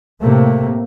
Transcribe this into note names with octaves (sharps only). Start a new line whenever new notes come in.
A2 C3 A3 A#3